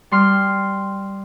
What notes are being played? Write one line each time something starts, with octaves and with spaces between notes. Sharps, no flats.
G3 C6 F6